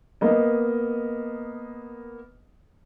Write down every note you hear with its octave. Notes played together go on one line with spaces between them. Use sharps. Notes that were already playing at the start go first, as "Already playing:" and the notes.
A#3 B3 D#5